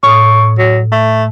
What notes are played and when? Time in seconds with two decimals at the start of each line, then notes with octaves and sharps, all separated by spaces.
0.03 A2 C#5 D#6
0.58 F#3
0.92 A3